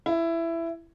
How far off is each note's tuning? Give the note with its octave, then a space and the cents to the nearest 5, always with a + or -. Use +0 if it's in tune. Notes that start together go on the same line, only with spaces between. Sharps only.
E4 +15